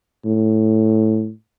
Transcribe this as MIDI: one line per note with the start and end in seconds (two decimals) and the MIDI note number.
0.25 1.30 45